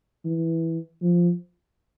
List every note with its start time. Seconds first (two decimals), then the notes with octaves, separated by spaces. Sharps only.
0.25 E3
1.02 F3